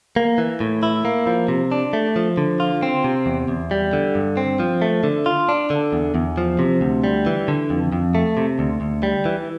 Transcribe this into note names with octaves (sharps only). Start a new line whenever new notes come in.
A#3
E3
A2
E4
A#3
F3
C3
D4
A3
F3
D3
F4
C4
C3
E2
E2
G3
D3
G2
C4
F3
A3
D3
F4
D4
D3
E2
E2
F3
C3
D2
G3
E3
D3
F2
F2
A3
C3
D2
D2
G3
E3